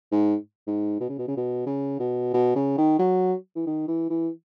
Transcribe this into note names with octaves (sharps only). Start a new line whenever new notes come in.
G#2
G#2
B2
C#3
B2
C#3
B2
C#3
B2
B2
C#3
D#3
F#3
E3
D#3
E3
E3